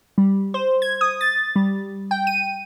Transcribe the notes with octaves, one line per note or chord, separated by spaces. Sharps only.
G3
C5
G#6
D#6
A6
G3
G5
D#7